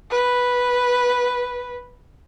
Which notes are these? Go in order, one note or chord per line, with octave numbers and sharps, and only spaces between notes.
B4